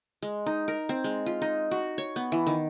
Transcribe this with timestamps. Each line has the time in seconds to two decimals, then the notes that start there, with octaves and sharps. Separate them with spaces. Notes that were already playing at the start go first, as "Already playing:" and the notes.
0.22 G#3
0.46 D#4
0.68 A#4
0.89 C4
1.04 G#3
1.26 F4
1.42 D#4
1.71 F#4
1.98 C#5
2.16 B3
2.32 E3
2.47 D#3